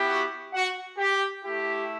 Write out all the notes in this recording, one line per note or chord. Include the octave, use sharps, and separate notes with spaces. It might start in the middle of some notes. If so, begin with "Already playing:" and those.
Already playing: B3 E4 G4
F#4 F#5
F#4 F#5
G4
A3 E4 G4